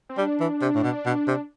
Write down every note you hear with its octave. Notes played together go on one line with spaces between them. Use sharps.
C4
G3 D4
E3
C3
A2
B2
B2
C3